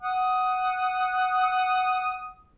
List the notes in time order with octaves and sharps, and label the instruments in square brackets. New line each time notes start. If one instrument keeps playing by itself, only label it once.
[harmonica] F#5 D#6